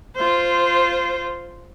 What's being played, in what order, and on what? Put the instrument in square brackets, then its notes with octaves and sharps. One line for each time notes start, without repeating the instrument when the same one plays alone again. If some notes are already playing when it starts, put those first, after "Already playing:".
[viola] F4 C5